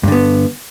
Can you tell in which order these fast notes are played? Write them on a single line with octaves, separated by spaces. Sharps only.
G2 D3 B3